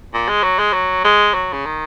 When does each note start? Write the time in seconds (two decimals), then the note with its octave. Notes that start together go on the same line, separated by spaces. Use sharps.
0.14 A#2
0.29 G#3
0.43 F#3
0.59 G#3
0.73 F#3
1.04 G#3
1.34 F#3
1.53 C#3
1.65 D#3